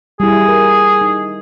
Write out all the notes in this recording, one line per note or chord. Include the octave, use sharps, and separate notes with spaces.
G3 E4 G#4
A#4
D#4